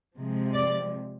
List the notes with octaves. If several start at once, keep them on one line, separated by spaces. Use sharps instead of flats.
C3 F3 G#3
D5